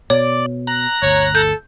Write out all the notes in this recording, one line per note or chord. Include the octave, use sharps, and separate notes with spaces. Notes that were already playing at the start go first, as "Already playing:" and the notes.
B2 C#5 D5
A#5 F#6
G1 D2 C#5
A4 G6